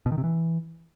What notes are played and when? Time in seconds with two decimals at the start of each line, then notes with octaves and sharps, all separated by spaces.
0.06 B2
0.12 D#3
0.18 C3
0.24 E3